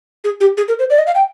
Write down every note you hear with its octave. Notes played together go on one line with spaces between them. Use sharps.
G#4
G4
G#4
A#4
C5
D5
D#5
F5
G5